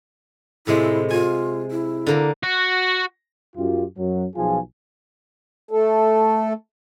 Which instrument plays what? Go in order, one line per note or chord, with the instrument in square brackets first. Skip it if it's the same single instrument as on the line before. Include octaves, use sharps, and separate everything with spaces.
[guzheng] A2 C3 G#3 [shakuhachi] E4
[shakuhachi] F4 [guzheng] G#5
[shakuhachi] E4
[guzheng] D3 A#3 A#5
[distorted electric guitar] F#4
[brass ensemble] F#2 F4 G4
F#2 F#3
B1 F3 F4 G#4 G#5
[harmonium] A3 A4